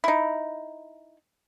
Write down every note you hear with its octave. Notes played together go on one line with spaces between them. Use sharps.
D#4 E4